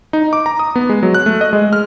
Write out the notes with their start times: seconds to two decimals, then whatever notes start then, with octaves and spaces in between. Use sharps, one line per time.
0.13 D#4
0.33 D6
0.46 A#5
0.59 D#6
0.76 B3
0.89 G#3
1.03 F#3
1.14 F#6
1.26 A3
1.41 D#5
1.53 G#3
1.73 F6